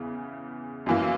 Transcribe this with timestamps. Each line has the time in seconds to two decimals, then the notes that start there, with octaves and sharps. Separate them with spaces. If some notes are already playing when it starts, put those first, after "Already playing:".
Already playing: E2 C#3 E3
0.86 F#2 E3 A#3